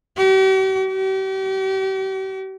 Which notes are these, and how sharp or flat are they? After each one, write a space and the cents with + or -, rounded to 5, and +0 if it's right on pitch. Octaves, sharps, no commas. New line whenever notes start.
G4 -45
G4 -40